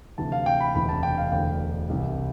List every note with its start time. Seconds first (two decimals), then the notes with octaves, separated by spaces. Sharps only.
0.18 D2 C3 E3 A5
0.32 F5
0.46 G5
0.60 B5
0.75 E1 D2 C3 E3 B5
0.89 A5
1.03 G5
1.18 F5
1.32 E1 D2 D3 G5
1.89 C2 C3 E3